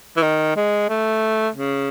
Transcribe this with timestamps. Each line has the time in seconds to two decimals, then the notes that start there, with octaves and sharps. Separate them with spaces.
0.17 E3
0.23 D#3
0.56 G#3
0.89 A3
1.55 C#3